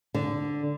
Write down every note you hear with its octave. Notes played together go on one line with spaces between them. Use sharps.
D3